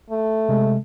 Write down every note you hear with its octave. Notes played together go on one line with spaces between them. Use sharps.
A3
C3 G#3